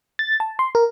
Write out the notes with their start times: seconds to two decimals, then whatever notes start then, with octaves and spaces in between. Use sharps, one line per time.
0.19 A6
0.40 A5
0.59 C6
0.75 A#4